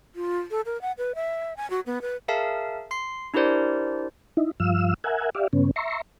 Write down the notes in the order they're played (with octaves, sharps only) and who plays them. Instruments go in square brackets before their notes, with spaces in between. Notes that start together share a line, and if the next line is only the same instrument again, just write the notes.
[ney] F4
A4
A#4
F#5
B4
E5
G#5
F#4
B3
B4
[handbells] G#4 A#4 E5 F5 A5
C6 C7
D4 E4 G4 A#4 C5 D5
[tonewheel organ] D#4 E4
G2 F3 F5 E6
A#4 E5 F#5 G#5
G4 D5 E5 F5
G2 C#3 B3 C#4
E5 A#5 C6 C#6